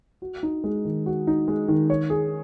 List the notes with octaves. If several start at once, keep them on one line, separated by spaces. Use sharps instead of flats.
F#4
D#4
G#3
D#3
F#4
D#4
G#3
D#3
C#5
G#4